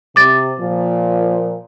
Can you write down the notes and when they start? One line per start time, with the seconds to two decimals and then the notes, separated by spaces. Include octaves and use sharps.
0.16 C3 D6 A6
0.59 A#2 F3